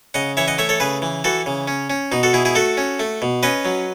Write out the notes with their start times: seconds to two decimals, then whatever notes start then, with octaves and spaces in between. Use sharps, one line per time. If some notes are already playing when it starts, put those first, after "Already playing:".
0.14 C#3 D#5 F#5
0.37 E3 C#5 E5
0.48 D#5 F#5
0.58 A3 C#5 E5
0.69 A4 C#5
0.80 C#3 G#4 B4
1.02 E3
1.24 E3 F#4 A4
1.46 C#3
1.68 C#4
1.90 C#4
2.12 B2 D#4
2.23 F#4 A4
2.33 B2 E4 G#4
2.45 E4 G#4
2.55 A3 F#4 A4
2.77 C#4
3.00 A3
3.22 B2
3.43 C#4 B4 D#5
3.65 F#3